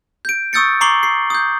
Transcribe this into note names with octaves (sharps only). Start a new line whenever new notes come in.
G6 D7
C#6 D#6 E6 G6 A6 C#7
A#5 C#6 D6 C7 F#7 G7
C7
D#6 G6